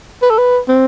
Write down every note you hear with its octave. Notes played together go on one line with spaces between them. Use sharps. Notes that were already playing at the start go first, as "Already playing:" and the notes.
B4
A4
B4
C4